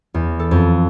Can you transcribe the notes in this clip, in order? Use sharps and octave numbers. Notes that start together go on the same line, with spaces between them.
E2
A4
F2